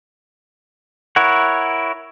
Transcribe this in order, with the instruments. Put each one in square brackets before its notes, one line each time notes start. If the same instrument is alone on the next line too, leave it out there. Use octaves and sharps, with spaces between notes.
[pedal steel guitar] E4 A#4 C#5 F#5